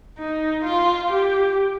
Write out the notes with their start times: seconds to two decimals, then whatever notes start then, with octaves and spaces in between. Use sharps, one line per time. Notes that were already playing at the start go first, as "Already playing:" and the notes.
0.18 D#4
0.65 F4
1.11 G4